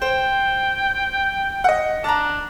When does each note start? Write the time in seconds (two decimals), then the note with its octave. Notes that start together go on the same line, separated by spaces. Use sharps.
0.02 C5 G5
1.64 D#5 F#5
2.04 D4 A5 A#5